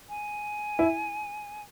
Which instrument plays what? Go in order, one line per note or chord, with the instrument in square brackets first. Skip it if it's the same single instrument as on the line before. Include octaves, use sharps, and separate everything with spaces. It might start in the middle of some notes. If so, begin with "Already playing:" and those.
[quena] G#5
[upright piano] E4